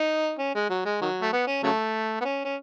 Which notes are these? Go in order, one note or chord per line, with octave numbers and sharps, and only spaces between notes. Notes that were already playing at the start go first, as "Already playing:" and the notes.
Already playing: D#4
C#4
G#3
F#3
G#3
D#3 F#3
A3
B3
C#4
C#3 F#3 A3
B3
C#4
C#4